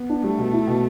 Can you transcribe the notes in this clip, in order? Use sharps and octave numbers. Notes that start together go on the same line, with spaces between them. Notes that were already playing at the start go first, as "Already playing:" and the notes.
Already playing: B3
D4
G3 A3
B2
E4
B2